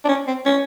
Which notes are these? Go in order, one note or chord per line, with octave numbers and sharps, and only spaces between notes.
D4
C#4
C4
C#4